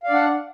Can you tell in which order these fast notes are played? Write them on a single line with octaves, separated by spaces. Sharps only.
F5 D5 D4 F#5